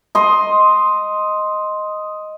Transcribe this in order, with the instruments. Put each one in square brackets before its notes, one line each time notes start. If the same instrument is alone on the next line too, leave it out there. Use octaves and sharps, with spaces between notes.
[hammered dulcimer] D#5 C6